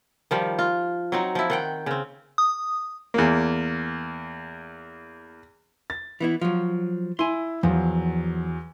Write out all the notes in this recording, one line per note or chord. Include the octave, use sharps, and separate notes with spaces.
D#3 F3 G3
F4
F#3 C4 D#4
F3 E4
D#3 F#5 G5
C#3 C4
D#6
E2 A#3
A6
E3 B3 E4
F3 F#3
E4 G#5 C6
E2 F3 F#3